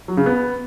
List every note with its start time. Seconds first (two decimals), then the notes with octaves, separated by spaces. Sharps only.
0.08 F#3
0.17 C#3
0.26 B3